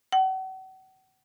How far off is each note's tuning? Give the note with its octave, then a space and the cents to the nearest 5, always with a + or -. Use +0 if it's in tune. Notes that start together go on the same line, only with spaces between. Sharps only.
F#5 +40